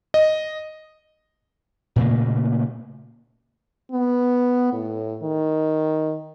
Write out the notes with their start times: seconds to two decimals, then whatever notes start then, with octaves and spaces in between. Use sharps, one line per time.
0.14 D#5
1.96 A#2 C#3 A3 A#3
3.91 B3
4.73 A2
5.23 D#3